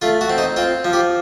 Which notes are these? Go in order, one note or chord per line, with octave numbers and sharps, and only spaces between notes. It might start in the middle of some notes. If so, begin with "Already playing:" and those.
A3 F4
F#4
C4
D#4
C4 F4
F3
G4